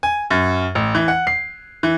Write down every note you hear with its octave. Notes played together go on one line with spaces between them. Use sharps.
G#5
F#2
A1
E3
F#5
C7
E3